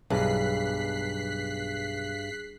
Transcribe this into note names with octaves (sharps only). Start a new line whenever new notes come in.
B1 G2 G#4 F#6 B6 C7